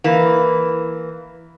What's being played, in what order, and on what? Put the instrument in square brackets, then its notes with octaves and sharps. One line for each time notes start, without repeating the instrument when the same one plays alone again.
[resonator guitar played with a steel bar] E3 A#3